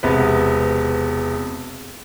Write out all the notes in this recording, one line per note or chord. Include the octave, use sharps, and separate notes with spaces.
E1 C3 B3 B4